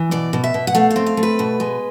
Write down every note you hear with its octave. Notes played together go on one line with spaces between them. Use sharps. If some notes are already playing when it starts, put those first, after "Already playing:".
Already playing: E3
B2 D5
B2
E5
B2
F#5
A3 F5
F5
C4
F5
A3
B4
B2
G#3